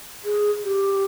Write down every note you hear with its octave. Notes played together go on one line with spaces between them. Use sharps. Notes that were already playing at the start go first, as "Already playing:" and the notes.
G#4
G4